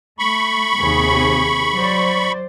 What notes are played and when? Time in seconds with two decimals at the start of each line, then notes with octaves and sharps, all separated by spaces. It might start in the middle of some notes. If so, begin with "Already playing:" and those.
0.19 A3 B5 C#6
0.78 D#2 C3 G#4
1.74 F#3 C5 D5